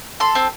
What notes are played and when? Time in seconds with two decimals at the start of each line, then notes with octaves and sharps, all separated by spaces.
0.20 A4 C6
0.35 C4